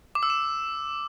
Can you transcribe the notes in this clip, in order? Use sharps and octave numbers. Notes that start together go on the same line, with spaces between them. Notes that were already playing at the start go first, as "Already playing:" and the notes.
D6
E6
E7